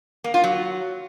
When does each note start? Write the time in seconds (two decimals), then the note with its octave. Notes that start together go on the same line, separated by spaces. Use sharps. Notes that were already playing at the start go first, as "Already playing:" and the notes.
0.24 A#3
0.34 F4
0.44 F#3